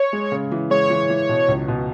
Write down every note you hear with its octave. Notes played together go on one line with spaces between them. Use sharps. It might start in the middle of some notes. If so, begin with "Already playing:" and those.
Already playing: C#5
G#3
C#3
E3
G#3 C#5
E3
E3
B2
C#2
B2